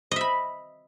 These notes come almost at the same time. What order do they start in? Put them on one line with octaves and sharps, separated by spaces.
D#5 E5 B5